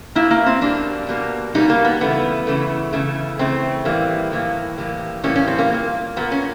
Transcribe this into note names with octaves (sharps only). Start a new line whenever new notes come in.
B2 G3 A#3 E4
A#3
C4
B2 G3 A#3 D4
B2 G3 A#3
B2 G3 A#3 D#4
A#3
B3
C#3 E3 A3 B3
C#3 E3 A3
C#3 E3 A3
C#3 E3 A3 C4
A2 E3 G3 A#3
A2 E3 G3 A#3
A2 E3 G3 A#3
A2 E3 G3 A#3 C#4
C#4
C4
A#3
A#2 G3 A#3
A#2 G3 A#3 B3
C#4